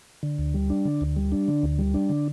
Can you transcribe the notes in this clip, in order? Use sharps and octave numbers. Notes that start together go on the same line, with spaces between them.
D3
D2
G3
D4
D3
D2
G3
D4
D3
D2
G3
D4
D3